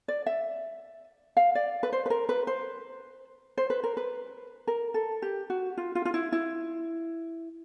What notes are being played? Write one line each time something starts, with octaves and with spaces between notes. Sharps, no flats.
D5
E5
F5
D5
B4
C5
B4
A#4
B4
C5
C5
B4
A#4
B4
A#4
A4
G4
F#4
F4
F4
F4
E4
E4